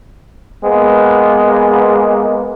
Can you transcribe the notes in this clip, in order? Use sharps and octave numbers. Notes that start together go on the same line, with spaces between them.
G#3 A#3 B3